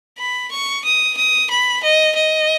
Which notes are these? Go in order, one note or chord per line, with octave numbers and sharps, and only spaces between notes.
B5
C#6
D#6
D#6
B5
D#5
D#5